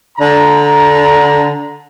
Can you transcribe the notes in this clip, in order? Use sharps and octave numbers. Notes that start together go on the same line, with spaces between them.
D3 A#5